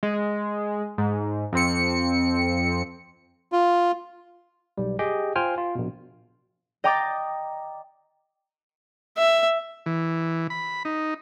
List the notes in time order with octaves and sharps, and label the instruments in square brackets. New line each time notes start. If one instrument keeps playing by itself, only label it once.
[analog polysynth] G#3
G#2
F2 C4 C#7
[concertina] F4
[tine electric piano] B1 G3
G4 G#4 D#5 G5
F4 C5 G5 G#5 F6
F4
A#1 B2
[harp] D#5 G5 A#5 D6 D#6 A6
[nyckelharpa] E5
[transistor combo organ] E3
B5
D#4